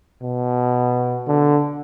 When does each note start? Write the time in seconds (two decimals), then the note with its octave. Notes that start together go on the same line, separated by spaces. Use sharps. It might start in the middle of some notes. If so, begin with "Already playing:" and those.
0.23 B2
1.27 D3